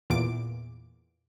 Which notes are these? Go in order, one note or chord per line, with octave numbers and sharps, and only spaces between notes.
E2 A#2 D6 D7